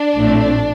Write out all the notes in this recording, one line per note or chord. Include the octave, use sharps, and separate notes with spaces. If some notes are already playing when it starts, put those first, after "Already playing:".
Already playing: D4
A#1 A2 A3 C4